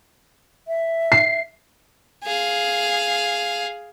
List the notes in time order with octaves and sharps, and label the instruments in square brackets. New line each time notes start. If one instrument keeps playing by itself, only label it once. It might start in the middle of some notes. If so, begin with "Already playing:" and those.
[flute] E5
[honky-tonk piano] C7
[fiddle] G#4 F5